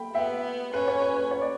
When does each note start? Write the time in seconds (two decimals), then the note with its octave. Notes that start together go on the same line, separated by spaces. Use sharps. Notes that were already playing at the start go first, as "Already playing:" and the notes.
Already playing: G5 B5
0.15 B3 E5 G5
0.74 C#4 B4
0.88 C#5
1.02 B4
1.16 B4
1.31 C#5
1.41 D5